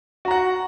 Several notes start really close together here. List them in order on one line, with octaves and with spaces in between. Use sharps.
F#4 A#5 F#5